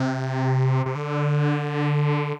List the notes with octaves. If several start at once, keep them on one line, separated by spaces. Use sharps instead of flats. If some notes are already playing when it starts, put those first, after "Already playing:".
Already playing: C3
C3
D3